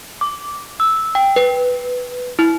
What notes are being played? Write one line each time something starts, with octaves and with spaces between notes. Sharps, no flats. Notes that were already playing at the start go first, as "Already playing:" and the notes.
D6
E6
G5
B4
E4